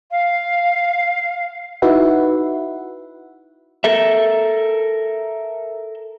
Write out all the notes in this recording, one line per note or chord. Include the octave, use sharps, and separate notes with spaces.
F5
D#4 E4 F#4 B4 E5 F#5
A4 A#4 E5